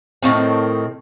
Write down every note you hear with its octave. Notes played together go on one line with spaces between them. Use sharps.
A2 D#3 C4